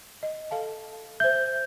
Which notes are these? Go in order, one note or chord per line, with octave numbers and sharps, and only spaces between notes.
D#5
A4 F5 A5
C5 E5 G6